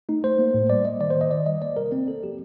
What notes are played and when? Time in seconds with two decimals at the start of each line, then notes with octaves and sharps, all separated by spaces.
0.09 A3 D#4
0.24 A3 C5
0.39 A#3
0.54 A2
0.70 G3 D5
0.85 A#3 D#5
1.00 D#3 D5
1.10 C5
1.15 D#3
1.21 D#5
1.31 D#3 D5
1.46 G3 D#5
1.61 A#3 D5
1.77 C3 A#4
1.92 A#3 C4
2.08 A#3 A4
2.23 F3 G4